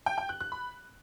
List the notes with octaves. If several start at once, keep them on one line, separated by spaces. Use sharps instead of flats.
G5
G5
F#6
F#6
B5